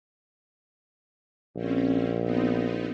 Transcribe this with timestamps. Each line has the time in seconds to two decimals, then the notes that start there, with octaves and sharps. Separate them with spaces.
1.56 A#1 C4 C#4
2.21 B3 C4 D#4